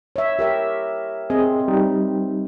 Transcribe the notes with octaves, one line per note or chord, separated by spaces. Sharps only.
C#5 E5
G4 A#4 E5
C4 G#4 D#5
G3 D#4